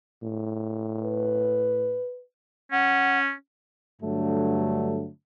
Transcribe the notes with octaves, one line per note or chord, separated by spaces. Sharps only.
A2
B4
C#4 F#5
G2 D3 F#3 A3